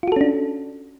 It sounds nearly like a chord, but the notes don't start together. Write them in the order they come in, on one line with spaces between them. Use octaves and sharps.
F4 F#4 A4 C#4 D4